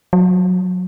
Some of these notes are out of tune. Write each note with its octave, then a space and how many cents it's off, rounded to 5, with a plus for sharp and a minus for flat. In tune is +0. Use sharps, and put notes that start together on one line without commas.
F#3 -25